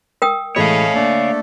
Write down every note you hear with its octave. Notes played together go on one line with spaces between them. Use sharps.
A#4 G5 D#6
A2 E3 G#3 A3 C#5 D#5 F5 B5
A3 A#3 D4 A4